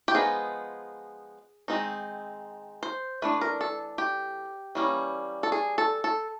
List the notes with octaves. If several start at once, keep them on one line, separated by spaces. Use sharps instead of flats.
G4
F3 G#3 B3 D#4 G#4
D#3 G#3 C4 D#4
C5
E3 A3 D4 B4
A#4
A4
G4
E3 G3 A#3 C#4
A4
G#4
A4
A4